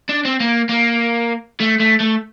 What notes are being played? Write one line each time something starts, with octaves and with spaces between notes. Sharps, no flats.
D4
C4
A#3
A#3
A3
A3
A3